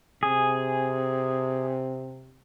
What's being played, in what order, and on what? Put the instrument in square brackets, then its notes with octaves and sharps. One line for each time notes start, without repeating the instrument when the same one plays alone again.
[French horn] C3 [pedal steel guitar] G#4